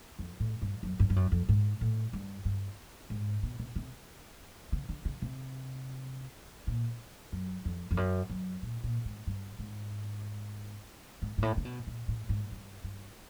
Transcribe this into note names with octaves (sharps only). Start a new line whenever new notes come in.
F2
A2
G2
F#2
G2
G2
F#2
F2
G#2
A2
G2
G2
G#2
B2
C3
C3
C#3
D3
C#3
C3
A#2
F#2
F2
F2
F#2
F#2
A#2
A#2
G#2
G2
G#2
G#2
G#2
A2
C3
B2
A#2
A2
G#2
G2
G2